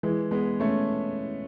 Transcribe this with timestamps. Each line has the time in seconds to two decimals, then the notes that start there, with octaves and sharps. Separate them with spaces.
0.03 E3 G#3
0.31 G#3 B3
0.60 A3 C#4